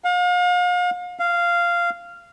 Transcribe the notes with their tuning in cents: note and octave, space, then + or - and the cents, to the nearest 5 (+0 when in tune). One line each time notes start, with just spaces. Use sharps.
F5 +40
F5 -10